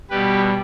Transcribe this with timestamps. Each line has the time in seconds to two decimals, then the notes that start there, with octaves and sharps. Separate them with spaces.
0.10 B2 G3 G4 B4